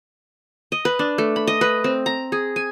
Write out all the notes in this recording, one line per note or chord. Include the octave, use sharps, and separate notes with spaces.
D#5
B4
D4
A3
B5
D#5
B4
C4
A#5
G#4
G#5